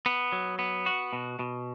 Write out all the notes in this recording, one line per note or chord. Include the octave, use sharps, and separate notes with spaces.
B3
F#3
B3
F#4
B2
B2